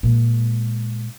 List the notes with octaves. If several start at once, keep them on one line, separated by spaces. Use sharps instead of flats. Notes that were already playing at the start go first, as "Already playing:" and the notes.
A#2 G#3